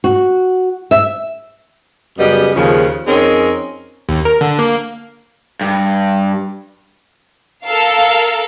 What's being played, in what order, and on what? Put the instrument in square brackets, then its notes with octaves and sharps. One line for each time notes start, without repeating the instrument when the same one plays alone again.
[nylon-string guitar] F#4
E5
[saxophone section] F#2 C#3 G3 B3 D#5
D#2 C#3 F3
F2 C4 C#4 D#4 G#4 A#4
[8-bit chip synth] D#2
A#4
D3
A#3
[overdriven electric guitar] G2
[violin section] A4 A#4 F5